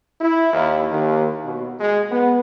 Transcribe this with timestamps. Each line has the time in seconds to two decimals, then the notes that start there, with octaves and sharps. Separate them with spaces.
0.21 E4
0.53 D#2
0.91 D#2
1.45 B2
1.80 G#3
2.11 B3